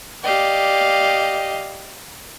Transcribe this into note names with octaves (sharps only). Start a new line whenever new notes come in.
G4 D5 D#5 F5